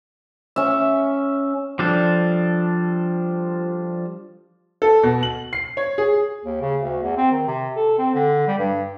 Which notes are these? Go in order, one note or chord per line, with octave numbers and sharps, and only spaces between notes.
C#4 E5
F3 G3 D4 A4
A4
B2
F#7
C7
C#5
G#4
D#2
C#3
D2
E2
C4
D#3
C3
A4
C4
D3
G3
G2